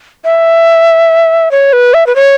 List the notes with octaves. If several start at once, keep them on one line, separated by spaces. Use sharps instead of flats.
E5
C#5
B4
E5
B4
C#5